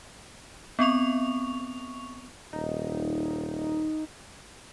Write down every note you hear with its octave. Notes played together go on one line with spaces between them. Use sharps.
B3 C4 C#6 F7
D#1 D#4